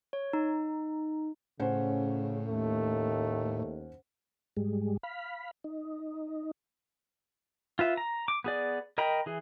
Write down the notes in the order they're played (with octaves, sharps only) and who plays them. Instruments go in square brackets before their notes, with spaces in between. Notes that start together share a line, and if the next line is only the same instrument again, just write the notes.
[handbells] C#5
D#4
[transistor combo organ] A2 [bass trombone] C#3 [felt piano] C#4 C5 F#5
[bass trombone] D#2 [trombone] A3
[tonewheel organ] G#2 G3 G#3
F5 B5
D#4
[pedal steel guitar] F4 B4 E5
A#5
D6
B3 G#4 D5
A#4 D#5 G5 A#5 B5
E3 G#4